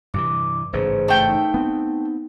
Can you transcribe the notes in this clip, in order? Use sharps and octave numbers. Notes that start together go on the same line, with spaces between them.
G2 C3 E3 D6
A1 G#2 C#3 G#4 B4 C5
A3 G5
D#4
B3 C4